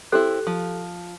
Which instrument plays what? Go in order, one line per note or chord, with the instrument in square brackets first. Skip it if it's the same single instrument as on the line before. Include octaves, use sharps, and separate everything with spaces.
[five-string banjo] C4 E4 [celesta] G4 A4 F#6
[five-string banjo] F3